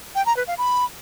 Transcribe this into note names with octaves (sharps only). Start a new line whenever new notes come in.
G5
A#5
B4
F5
B5